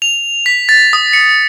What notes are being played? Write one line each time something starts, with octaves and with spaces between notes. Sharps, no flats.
F7
B6
A6
D#6
C#7